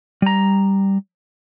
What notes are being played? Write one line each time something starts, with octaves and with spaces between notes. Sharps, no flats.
G3 A#5